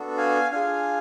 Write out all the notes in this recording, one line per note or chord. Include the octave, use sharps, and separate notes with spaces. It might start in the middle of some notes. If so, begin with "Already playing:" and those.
Already playing: B3 D4 F#4 A4
F5 G#5
D4 F4 G#4 F5 G#5